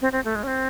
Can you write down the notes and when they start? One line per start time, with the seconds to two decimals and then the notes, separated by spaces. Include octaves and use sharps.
0.01 C4
0.12 C4
0.25 A3
0.35 G#3
0.43 C#4
0.47 C4